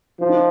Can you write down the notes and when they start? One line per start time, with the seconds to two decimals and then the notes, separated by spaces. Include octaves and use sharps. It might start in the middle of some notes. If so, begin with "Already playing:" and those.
0.20 F3 F4
0.29 D#4